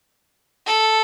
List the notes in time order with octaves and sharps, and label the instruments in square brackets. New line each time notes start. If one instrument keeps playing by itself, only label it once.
[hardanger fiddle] A4